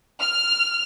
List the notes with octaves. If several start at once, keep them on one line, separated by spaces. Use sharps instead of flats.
F6